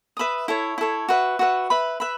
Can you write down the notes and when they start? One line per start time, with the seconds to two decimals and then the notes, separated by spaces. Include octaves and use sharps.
0.17 B4 E5 B5 D#6
0.48 E4 A4 C#5
0.78 E4 A4 C#5
1.09 F#4 B4 E5
1.39 F#4 B4 E5
1.70 B4 E5 B5
2.00 B4 E5 B5